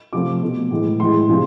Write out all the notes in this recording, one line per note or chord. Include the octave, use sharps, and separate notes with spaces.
C3 F3 A3 D6
B2 A3
A2 E3 G#3
A2 E3 G#3 C6
C3 F3 G#3